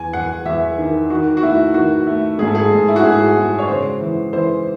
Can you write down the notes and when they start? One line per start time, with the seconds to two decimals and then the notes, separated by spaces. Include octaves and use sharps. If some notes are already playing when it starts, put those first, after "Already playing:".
Already playing: E2 G#5
0.13 E2 F#5
0.45 E2 E5
0.78 D#3
1.10 D#3 F#4
1.37 F#4
1.43 A3 E4
1.74 D#3 F#4
2.07 A3
2.39 G#2 G#4
2.47 A4
2.55 G#4
2.71 G#2
2.88 E4
2.96 F#4
3.03 G#2 G#4
3.36 G#3
3.59 C#5
3.68 C#3 C5
4.01 E3
4.33 E3 C5